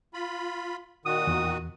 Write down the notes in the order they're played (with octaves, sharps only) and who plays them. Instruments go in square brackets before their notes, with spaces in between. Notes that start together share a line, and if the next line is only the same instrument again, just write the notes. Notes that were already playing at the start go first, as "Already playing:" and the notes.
[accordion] F4 B5
[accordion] A#2 D#3 F#4 [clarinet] D#6
[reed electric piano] E2